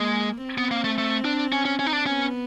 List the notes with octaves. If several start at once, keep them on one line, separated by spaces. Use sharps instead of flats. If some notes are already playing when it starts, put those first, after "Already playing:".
Already playing: G#3 A#3
C4
B3
A#3
A3
A3
D4
C#4
C#4
C#4
D#4
D4
B3 C#4